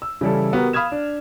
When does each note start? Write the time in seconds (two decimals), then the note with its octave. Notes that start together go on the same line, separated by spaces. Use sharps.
0.02 E6
0.21 C#3 E3 G3 E4 A4
0.53 B3 F#4 G4 A#4
0.73 F5 B5 D#6 F6 G#6 E7
0.92 D4